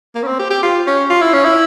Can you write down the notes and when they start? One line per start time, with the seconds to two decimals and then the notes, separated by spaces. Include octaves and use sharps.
0.15 A#3
0.23 C#4
0.27 C4
0.39 G4
0.50 G4
0.63 F4
0.87 C#4
1.10 F4
1.21 E4
1.33 C#4
1.44 E4